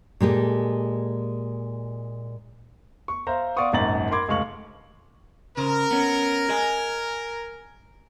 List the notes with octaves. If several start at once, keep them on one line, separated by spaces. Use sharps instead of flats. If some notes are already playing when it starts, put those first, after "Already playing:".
A#2 G#3 G4 A4
C#6
C5 E5 F5 A#5
D5 F5 F#5 C6 C#6 D#6
D#1 G#1 F#2 A#5 A6 F#7
A#4 B5 C6 D6 G#6
F1 C#2 A3 F5 C#6 F#7
C#3 A#4 C5
B3 C#4
G#4 D#5 G#5